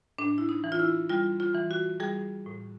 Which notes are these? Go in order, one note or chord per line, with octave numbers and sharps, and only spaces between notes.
A2 D4
E4
D#4
E3
F4
E4
G3 F4
F4
E3
F#4
G3 G#4
A2